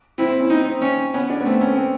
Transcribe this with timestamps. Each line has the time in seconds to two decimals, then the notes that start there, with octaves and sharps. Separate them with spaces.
0.18 C4 E4
0.29 C4
0.40 C#4
0.50 C4 D#4
0.66 C4
0.82 C4 C#4
1.14 B3 C#4
1.30 D4
1.40 B3
1.45 A3 C4
1.61 C#4
1.77 C4